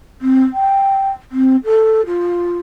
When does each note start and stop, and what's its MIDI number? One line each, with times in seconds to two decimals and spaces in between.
0.21 0.42 60
0.53 1.10 79
1.31 1.56 60
1.64 2.01 69
2.06 2.58 65